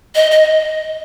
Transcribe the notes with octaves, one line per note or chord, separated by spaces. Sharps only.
D#5
D#5